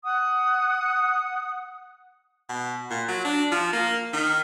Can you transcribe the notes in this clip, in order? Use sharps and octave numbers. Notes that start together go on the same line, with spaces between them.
F#5 D#6
B2
A#2
F#3
D4
F3
A#3
D#3